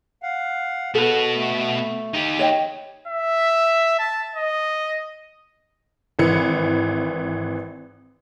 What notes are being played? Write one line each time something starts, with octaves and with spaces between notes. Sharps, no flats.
F5 F#5
B3 F#4 A4 B4
A3
D#4 G4
C#5 D#5 G5
E5
A5
D#5
G#1 E3 C#7